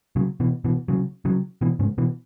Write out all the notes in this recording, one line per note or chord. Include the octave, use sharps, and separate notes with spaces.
C#3 F#3
B2 E3
B2 E3
C#3 F#3
C#3 F#3
B2 E3
G#2 C#3
B2 E3